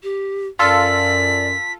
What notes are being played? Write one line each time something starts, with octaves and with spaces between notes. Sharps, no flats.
G4
F#2 F4 A4 D5 B6